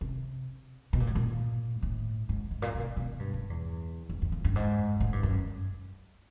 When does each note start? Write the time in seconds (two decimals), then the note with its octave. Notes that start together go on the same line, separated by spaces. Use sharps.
0.01 C3
0.93 B2
1.00 A#2
1.07 A2
1.15 A#2
1.82 A2
2.29 G#2
2.51 G#2
2.62 A#2
2.74 B2
2.97 B2
3.19 G2
3.34 G2
3.50 E2
4.09 F2
4.22 F2
4.32 F2
4.44 G2
4.56 G#2
5.00 A2
5.12 G2
5.23 F#2